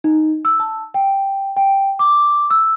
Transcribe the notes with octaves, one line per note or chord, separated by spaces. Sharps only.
D#4
E6
A5
G5
G5
D6
E6